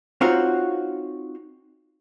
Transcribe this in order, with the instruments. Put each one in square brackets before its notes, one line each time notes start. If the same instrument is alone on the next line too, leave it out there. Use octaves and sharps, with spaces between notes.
[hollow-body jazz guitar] C4 D#4 F4 F#4 C5 C#5